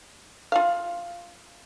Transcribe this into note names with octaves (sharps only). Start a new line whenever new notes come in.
F4 F5